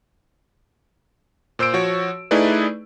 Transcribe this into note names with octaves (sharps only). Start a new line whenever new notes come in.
A#2 C5 E6 D7
F3 F#4 C#5
A3 D#4 E4 G#4 B4 D5